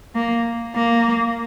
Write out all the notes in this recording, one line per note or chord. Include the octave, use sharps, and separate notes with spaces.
A#3
A#3